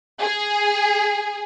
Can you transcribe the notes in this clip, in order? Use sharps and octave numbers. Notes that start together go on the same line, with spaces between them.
G#4